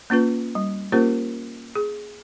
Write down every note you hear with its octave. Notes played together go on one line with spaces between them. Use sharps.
A#3 C#4 F4 B4
G3
A#3 C#4 F4 G4 A#4 C5
G#4